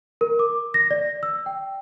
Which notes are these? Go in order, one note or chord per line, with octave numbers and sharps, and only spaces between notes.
A#4
D6
A#6
D5
E6
G5